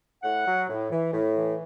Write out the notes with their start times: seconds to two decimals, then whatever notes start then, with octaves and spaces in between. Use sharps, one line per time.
0.23 A2 F#5
0.46 F#3
0.69 A2
0.91 E3
1.13 A2
1.36 E3